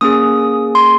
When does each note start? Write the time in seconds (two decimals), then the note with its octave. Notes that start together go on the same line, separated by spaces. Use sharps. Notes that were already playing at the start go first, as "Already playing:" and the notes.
0.01 A#3 C#4 G#4 D#6
0.75 C6